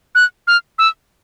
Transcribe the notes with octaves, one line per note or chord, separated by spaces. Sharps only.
F#6
F6
E6